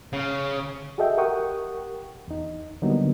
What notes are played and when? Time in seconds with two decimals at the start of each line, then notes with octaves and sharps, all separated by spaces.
0.13 C#3
0.98 F#4 G#4 A4 D#5 E5 G5
1.17 G4 A#4 F#5 G5 C#6 D#6
2.28 E2 D#4
2.82 D3 F#3 G3 A#3 B3 D#4